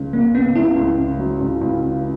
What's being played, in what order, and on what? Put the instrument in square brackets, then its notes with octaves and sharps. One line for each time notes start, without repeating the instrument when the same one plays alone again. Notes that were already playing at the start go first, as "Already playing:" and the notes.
Already playing: [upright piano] C#2 C#3
[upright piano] C#3 [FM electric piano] A#3
[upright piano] C#3 [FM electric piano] B3
[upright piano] C#2 [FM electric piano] E4
[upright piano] C#2
C#3
F#3
C#2
C#2
C#3